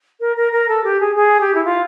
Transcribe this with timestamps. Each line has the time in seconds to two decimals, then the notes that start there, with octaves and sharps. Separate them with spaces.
0.20 A#4
0.36 A#4
0.51 A#4
0.68 A4
0.83 G4
1.00 G#4
1.15 G#4
1.40 G4
1.54 E4
1.64 F4